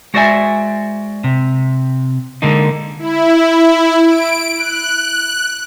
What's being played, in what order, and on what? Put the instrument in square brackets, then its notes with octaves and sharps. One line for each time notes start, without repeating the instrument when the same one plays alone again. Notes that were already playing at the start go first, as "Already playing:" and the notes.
[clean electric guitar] G#3 F#4 C5 D5 E5 G#5
C3
D3 G#3 A#3 D#4
[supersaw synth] E4
D7
F#6